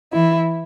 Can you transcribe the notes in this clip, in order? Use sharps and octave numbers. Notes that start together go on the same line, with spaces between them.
E3 E4